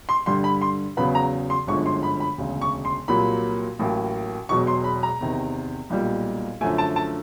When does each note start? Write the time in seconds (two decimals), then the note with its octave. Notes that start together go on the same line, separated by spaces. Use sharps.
0.09 C6
0.26 G2 D3 G3 C6
0.44 B5
0.62 C6
0.97 E2 C#3 F#3 B3 B5
1.15 A#5
1.50 C6
1.67 G1 F#2 D3 F3 G#3 C#6
1.86 C6
2.03 B5
2.20 B5
2.38 E1 D2 C#3
2.61 C#6
2.85 C6
3.08 C2 A#2 F#3 A#3 B5
3.79 A1 A2 F#3 A#3
4.49 E1 E2 B2 F#3 C#6
4.67 C6
4.84 B5
5.03 A#5
5.20 E2 C3 D#3
5.90 B1 A#2 G3
6.61 F#2 D3 F3 A3 G#5
6.78 A5
6.96 A5